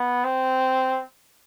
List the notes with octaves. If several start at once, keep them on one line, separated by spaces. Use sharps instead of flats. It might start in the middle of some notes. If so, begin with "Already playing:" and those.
Already playing: B3
C4